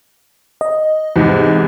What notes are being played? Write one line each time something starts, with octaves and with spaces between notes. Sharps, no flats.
D#5
E2 G#2 C3